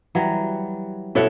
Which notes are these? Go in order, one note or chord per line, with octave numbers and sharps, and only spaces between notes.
E3 F#3 G3
B2 E4 A4 C#5 E5 F#5